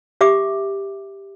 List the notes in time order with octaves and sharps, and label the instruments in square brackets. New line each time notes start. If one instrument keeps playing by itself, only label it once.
[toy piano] G4 E5 D6